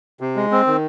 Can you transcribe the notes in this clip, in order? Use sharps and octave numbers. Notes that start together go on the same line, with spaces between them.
C3
G#3
C4
D#3